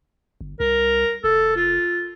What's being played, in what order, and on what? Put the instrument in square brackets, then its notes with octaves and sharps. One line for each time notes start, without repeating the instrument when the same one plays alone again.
[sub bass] G1
[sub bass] C2 [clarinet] A#4
[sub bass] F1 [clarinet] A4
[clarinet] F4